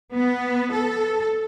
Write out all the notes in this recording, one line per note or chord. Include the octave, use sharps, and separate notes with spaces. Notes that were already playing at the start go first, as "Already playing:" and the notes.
B3
A4